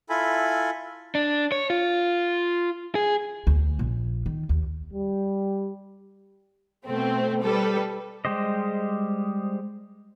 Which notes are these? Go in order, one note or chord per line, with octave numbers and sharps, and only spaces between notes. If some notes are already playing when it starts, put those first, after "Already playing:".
E4 F4 A4 G#5 B5
D4
C#5
F4
G#4
D2
A#1
D#3
D#2
G3
B2 A3 C4
G3 A4 B4
G3 G#3 G4 C5 D#5